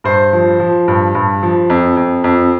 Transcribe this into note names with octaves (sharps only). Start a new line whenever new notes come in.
G2 C5
F3
F3
G2
G2
F3
F2
F2
F2